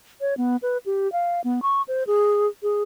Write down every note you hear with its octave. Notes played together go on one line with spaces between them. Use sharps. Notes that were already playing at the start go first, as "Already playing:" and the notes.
C#5
B3
B4
G4
F5
B3
C#6
C5
G#4
G#4